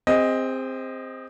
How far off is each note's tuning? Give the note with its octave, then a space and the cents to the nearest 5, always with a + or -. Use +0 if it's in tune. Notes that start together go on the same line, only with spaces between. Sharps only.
C4 +0 G#4 -35 D#5 +5